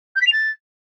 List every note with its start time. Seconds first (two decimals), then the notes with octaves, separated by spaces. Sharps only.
0.16 G6
0.21 B6
0.27 F7
0.32 A6